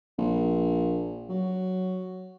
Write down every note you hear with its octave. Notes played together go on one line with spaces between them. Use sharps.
A#1
F#3